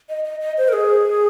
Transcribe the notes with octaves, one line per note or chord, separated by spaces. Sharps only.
D#5
D#5
D#5
C5
A#4
G#4